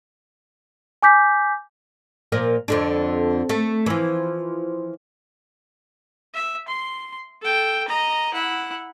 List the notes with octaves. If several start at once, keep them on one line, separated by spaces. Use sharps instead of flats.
G#5 D6 G6 B6
A#2 F3 A#4
F2 D3 D4
A3
E3 F3
E5
C6
A4 G5
D#5 A#5
E4 F#5